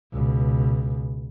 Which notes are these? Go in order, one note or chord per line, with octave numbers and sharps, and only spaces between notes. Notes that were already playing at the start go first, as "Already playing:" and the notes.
C#2 B2